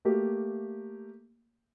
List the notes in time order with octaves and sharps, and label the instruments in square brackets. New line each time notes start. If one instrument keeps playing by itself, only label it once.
[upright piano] A3 A#3 G4